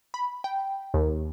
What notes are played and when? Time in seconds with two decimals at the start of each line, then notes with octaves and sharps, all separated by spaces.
0.14 B5
0.44 G5
0.94 D#2